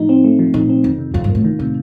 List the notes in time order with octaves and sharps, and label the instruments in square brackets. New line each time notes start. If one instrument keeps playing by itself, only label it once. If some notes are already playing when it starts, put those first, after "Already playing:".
Already playing: [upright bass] A2 [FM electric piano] F3 A3 D#4
[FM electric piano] C4
A3
F3
[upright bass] A#2 [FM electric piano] D#4
[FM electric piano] C4
[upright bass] F2 [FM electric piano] D#3
[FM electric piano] C3
[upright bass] F2 [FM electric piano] F4
[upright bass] G2
[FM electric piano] A#3
[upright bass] A2
[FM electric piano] D#3
[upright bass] A2 [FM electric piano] C3